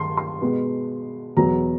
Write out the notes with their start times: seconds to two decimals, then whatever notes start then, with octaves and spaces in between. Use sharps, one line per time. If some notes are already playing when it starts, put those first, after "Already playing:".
Already playing: G2 D#3 C6 C#6
0.17 C6
0.41 B2 G#3 B3
1.37 E2 B2 F#3 B3 A#5